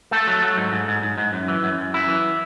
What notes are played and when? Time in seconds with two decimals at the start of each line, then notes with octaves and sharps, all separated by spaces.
0.11 A3 A4
0.27 F#3
0.42 F#3
0.57 G#2
0.72 G#2
0.88 G#2
1.03 G#2
1.18 G#2
1.33 F#2
1.48 E3
1.64 F#2
1.78 F#2
1.94 F#2 E4
2.08 E3